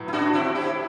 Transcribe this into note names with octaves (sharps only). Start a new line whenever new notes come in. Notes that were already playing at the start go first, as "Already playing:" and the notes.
Already playing: A2 F#3 B3
E4
D4 F#4
C4 E4
E4 G4